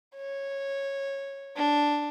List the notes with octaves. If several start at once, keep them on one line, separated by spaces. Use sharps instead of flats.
C#5
D4